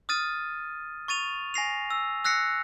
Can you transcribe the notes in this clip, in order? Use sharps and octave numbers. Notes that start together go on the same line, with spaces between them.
D#6 F6 A6 D#7
C#6 A6 D#7 F7
G#5 A#6 C7 F7
E6
E6 F#6 A#6 C7 C#7